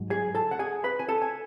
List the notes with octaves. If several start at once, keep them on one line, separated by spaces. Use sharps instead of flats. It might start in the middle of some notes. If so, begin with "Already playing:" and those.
Already playing: G#2 F#3
G#4 G#5
A4 A5
F#5
G#4 G#5
B4 B5
G#5
A4 A5
G#5